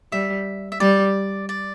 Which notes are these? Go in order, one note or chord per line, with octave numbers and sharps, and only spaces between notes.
G3 E5
E5
G3 D5
D5